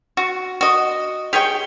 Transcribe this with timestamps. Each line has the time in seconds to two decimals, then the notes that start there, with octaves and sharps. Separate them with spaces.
0.17 F#4
0.61 F#4 D#5
1.33 G4 G#4 C#5 G5